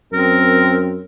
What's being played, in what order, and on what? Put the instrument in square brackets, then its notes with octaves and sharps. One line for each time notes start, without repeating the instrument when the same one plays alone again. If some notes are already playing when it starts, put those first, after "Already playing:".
[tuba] F#2 [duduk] C4 [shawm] A#4